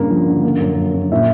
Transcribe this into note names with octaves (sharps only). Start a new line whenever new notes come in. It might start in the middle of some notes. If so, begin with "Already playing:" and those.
Already playing: G2 C#3 A#3
F3
D3
A#3
F#2
F#3
C#3
A#2 E5